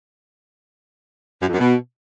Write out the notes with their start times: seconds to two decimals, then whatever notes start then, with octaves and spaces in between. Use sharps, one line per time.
1.42 F#2
1.48 F2
1.53 F#2
1.59 B2